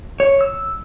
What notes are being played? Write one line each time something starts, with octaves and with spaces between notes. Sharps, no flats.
C#5
E6